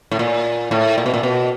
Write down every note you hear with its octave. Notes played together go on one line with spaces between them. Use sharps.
A2
A#2
A2
A#2
B2
A#2
B2